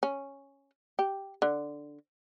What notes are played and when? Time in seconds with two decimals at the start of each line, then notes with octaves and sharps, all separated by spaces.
0.03 C#4
0.99 G4
1.42 D3